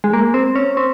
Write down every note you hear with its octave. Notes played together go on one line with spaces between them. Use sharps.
G#3
A#3
C4
C#4
C4